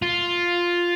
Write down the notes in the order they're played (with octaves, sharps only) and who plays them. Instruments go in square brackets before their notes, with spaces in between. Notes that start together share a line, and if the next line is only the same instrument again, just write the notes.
[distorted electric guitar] F4